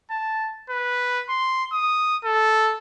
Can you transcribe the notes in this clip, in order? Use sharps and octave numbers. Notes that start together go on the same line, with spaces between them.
A5
B4
C6
D#6
A4